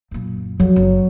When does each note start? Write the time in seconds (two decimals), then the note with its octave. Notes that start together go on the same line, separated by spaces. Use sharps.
0.11 F#2 A#2
0.60 F3 F#3
0.76 F#1 C4